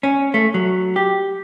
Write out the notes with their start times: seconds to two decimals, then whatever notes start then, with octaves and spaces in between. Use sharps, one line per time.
0.03 C#4
0.34 A3
0.54 F#3
0.96 G4